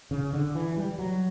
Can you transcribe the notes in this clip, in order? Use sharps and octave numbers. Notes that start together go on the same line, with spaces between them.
C#3
D3
E3
G3
F#3